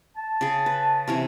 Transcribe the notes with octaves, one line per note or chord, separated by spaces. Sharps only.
A5
C#3 G#4
B4
C3 E3 C#5